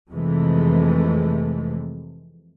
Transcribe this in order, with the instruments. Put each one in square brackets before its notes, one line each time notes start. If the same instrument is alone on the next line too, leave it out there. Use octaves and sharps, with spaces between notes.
[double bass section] F2 C3 E3 G#3 A3